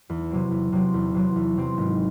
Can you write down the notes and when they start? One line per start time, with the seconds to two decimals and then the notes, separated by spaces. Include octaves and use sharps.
0.10 E2
0.31 C3 F#3 C4
0.51 E2
0.72 C3 F#3 C4
0.94 E2
1.14 C3 F#3 C4
1.36 E2
1.57 C3 F#3 C4
1.78 G#1